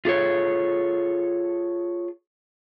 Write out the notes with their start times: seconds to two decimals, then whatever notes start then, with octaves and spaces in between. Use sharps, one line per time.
0.05 F4 G#4 A4 C#5